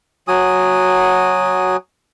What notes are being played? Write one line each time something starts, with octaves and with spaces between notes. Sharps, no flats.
F#3 F#4 G#5 D#6